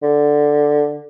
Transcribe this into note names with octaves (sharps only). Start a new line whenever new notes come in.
D3